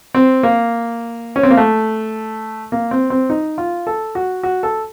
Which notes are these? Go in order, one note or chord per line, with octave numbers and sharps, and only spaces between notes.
C4
A#3
C#4
C4
A#3
A3
A#3
C4
C4
D#4
F4
A4
F#4
F#4
A4